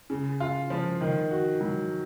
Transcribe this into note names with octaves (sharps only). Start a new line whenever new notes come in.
C#3
F4
F3
D#3
F#4
F#3